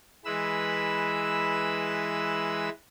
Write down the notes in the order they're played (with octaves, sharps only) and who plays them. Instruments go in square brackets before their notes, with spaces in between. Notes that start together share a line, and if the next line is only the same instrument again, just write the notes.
[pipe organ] E3 G#3 B4 B5 E6